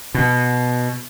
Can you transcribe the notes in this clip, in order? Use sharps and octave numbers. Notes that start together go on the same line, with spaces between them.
B2